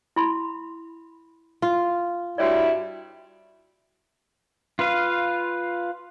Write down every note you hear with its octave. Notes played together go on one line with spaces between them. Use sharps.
E4 B5 C6
F4
G2 G3 E4 F#4 C#5 D5
F4 B4 F5